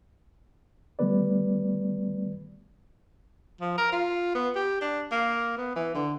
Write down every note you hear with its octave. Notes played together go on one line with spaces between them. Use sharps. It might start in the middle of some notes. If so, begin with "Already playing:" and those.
D#3 G3 A3 B3 B4 D5
F3
A#4
F4
B3
G4
D4
A#3
B3
E3
D3